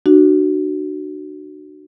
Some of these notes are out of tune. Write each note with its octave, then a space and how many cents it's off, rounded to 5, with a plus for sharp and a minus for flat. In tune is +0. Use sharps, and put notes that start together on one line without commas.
D4 +40 F#4 +15